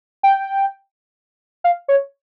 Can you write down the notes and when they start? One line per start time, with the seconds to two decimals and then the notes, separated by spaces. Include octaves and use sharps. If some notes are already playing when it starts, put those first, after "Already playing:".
0.23 G5
1.64 F5
1.88 C#5